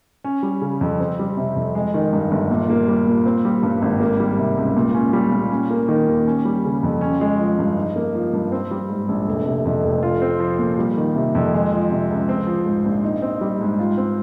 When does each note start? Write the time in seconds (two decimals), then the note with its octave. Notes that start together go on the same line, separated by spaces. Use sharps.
0.24 C#4
0.43 G3
0.61 C#3
0.81 F2
1.00 C4
1.19 G3
1.37 C3
1.56 F2
1.75 G#3
1.94 D#3
2.13 G2
2.31 G1
2.51 A#2
2.70 A#3
2.88 G3
3.07 A#2
3.26 C4
3.45 G3
3.63 G2
3.82 G#1
4.00 A#3
4.20 G3
4.38 C3
4.57 C#2
4.77 A#2
4.94 C#4
5.13 G3
5.32 A#2
5.51 C#4
5.70 A#3
5.88 D#3
6.08 D#2
6.27 C#4
6.45 G3
6.65 C#3
6.83 F2
7.01 C#4
7.21 G#3
7.39 F3
7.59 G2
7.77 D#4
7.96 A#3
8.15 F3
8.33 G2
8.52 C4
8.71 G3
8.89 G#2
9.08 A#1
9.27 F1
9.46 C3
9.65 F2
9.84 F1
10.03 F4
10.22 C4
10.40 F3
10.59 A#2
10.79 G3
10.97 D#3
11.15 C3
11.35 F2
11.54 G#3
11.72 F3
11.91 C3
12.10 C#2
12.29 C4
12.47 F3
12.66 G#2
12.86 A#1
13.04 D#4
13.22 C4
13.41 G3
13.61 G#2
13.79 F4
13.98 C4